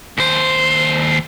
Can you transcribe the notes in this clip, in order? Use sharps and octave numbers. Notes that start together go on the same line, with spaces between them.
D#2 C5